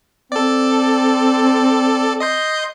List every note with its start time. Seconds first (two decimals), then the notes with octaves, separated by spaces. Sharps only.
0.32 C4 A4 D5
2.20 D#5 C6 G6